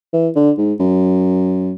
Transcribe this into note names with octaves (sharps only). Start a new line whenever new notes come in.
E3
D3
G#2
F#2